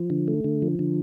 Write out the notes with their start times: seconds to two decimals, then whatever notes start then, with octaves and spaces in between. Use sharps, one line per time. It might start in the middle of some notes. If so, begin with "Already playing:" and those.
Already playing: F3
0.10 D3
0.28 A3
0.44 D3
0.62 F3
0.79 D3